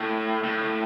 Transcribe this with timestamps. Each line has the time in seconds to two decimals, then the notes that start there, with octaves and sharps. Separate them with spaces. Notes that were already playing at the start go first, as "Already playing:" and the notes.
Already playing: A2
0.44 A2